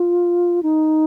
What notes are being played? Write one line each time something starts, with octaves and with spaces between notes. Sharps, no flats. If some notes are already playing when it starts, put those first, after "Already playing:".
Already playing: F4
D#4